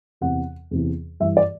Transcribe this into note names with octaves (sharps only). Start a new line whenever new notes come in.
E2 C3 E3 F#5
E2 C3 E3
G2 E3 E5
D5